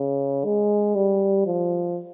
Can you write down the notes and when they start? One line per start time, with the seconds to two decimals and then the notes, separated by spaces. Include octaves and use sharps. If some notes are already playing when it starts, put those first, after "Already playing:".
Already playing: C#3
0.45 G#3
0.96 G3
1.46 F3